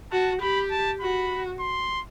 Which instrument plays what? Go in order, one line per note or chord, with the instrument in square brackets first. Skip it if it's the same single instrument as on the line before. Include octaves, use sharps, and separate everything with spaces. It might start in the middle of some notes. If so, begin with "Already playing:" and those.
[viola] F#4 [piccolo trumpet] A5
[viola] G4 [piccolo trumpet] B5
[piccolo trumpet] A5
[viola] F#4 [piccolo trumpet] B5
[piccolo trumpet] C6